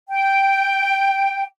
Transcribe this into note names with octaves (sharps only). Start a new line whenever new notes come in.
G5